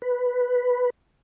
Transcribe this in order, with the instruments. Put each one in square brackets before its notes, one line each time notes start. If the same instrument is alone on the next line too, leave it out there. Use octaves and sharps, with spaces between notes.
[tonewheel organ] B4